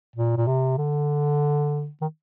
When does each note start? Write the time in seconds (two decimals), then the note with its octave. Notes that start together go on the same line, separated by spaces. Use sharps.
0.16 A#2
0.37 A#2
0.47 C3
0.78 D3
2.01 D#3